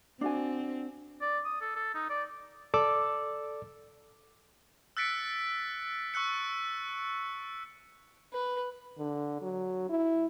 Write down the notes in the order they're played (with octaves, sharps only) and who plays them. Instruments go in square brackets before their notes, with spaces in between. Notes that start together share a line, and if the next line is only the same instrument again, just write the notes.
[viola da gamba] C4 [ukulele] D4 F#4 G#5
[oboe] D5
D#6
A4
A4
D#4
D5
[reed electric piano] A4 D5 D6 E6
[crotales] E6 F#6 A6 B6 C#7 D7
C#6 E6 F#6 C#7
[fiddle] B4
[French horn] D3
F#3
E4